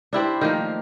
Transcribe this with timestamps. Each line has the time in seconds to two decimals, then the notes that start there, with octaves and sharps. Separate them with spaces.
0.13 D4 E4 G4 C5
0.41 D#3 F3 A3 A#3